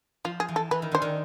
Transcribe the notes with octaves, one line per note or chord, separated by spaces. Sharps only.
F3 F4
G#4
E3
A4
E3 B4
D#3
D3 C5
D#3